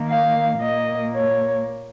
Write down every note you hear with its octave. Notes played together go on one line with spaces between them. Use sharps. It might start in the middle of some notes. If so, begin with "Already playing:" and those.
Already playing: D#3 A#3
F5
A#2 A#3 D#5
C#5